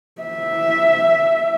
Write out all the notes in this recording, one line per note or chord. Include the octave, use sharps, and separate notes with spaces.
E5